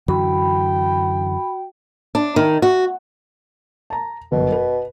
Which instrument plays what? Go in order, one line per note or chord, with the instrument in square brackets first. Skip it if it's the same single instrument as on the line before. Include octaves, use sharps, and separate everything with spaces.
[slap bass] F#2 D3 E3 [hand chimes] F#4 [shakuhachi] G5 [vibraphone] B5
[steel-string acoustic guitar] D4
D#3
F#4
[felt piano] A5 A#5
[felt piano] G1 F#2 [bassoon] B2
[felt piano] B4